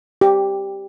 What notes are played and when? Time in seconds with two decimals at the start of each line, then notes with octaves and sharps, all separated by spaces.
0.21 G4